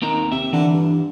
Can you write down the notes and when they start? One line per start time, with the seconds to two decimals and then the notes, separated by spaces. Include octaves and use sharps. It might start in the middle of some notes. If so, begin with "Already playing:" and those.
0.02 D#2 D#3 C4 A#5
0.32 C3 E5
0.53 D3 E3
0.73 G2